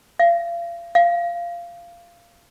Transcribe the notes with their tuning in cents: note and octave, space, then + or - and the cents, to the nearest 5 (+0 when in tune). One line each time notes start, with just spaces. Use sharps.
F5 -35
F5 -15